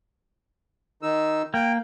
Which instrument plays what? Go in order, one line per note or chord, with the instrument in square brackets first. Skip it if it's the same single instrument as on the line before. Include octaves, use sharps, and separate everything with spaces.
[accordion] D#3 D#4 E6
[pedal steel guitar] A#3 [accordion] G5